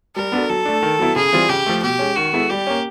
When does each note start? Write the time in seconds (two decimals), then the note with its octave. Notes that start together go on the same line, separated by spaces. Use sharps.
0.16 G3 A#4
0.32 B3 D4 F#4 A4
0.50 F#3 A4
0.65 A3 D4
0.83 D#3
0.99 F#3 B3 E4
1.16 C#3 G#4
1.33 E3 G3 C4 F4
1.49 C#3 G4
1.66 F3 A3
1.83 B2 G4
1.99 G#3 C#4
2.16 D#3 F#4
2.33 G#3 B3 E4 A4
2.50 G3 G4
2.67 A#3 C#4